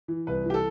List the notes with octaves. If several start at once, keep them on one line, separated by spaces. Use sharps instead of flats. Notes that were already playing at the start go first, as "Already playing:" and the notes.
E3
C2 B4
E3 G4
A4